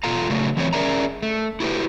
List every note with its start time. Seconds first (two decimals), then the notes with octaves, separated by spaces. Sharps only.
0.03 E2 B2 F4 A4 F5 A#5
0.30 C#3 F#3 A3
0.57 E3 F#3 C4 B4 C#5
0.73 C#4 G#4 A#4 D5 E5 A#5
1.23 A3
1.60 E4 F#4 G4 A#4 B4